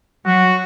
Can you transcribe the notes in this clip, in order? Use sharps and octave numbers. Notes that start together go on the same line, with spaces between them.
F#3 F#4